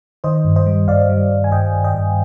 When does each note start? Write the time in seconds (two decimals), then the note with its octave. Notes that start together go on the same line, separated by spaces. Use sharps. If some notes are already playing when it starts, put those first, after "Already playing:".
0.24 D#3 C5 D#5
0.45 G2
0.56 C5 D#5
0.66 G3
0.88 G2 D5 F5
1.09 G3
1.31 G2
1.44 G#5
1.52 G2 D#5 G5
1.74 G2
1.84 D#5 G5
1.95 G2